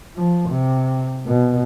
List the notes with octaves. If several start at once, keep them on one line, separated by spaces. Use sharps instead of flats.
F3
C3
B2